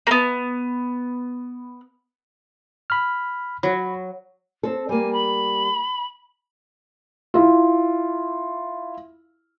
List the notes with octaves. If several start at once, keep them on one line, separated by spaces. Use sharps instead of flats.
A#3 B3
B5 F6
F#3 B5
C4 A4
G3 A#3 G#5
B5
E4 F4